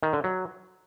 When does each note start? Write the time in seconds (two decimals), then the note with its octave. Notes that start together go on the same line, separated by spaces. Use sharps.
0.03 D#3
0.13 D3
0.24 F#3